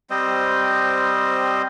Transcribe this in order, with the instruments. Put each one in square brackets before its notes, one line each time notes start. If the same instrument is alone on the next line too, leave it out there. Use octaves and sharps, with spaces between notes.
[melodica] G3 C4 C5 D#5